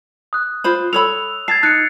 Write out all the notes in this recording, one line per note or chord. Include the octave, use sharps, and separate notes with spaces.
D#6 F#6
F4 C5 B5
A4 C#5 B5 E6 F7
A5 G#6 A6 C7
D#4 F#6 C#7